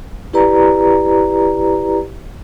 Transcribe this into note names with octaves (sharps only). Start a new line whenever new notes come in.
E4 G4 B4 D5 A#5